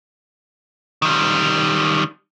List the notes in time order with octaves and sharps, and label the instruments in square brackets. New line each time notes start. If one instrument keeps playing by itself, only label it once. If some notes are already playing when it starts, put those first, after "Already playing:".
[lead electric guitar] D#3 G3